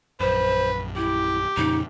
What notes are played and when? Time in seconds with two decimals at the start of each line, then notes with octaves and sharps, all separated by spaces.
0.20 A#1 F#2 B4 C5
0.96 E4 G4
1.57 F2 A#2 C#3 D#4